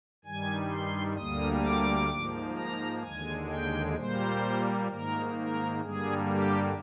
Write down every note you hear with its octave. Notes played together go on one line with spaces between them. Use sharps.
G2 D#3 G3 G#5
C6
D2 D3 G3 A#3 D#6
D6
G#2 F3 A#3
A#5
D#2 D3 G#3 G#5
G5
A#2 G3 A#3 C5
G#2 D#3 A#3 A#4
A#4
G2 D3 G3 A#3 G#4
G4